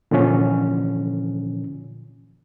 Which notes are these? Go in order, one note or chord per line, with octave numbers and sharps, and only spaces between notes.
A#2 D3 E3 F3 C#4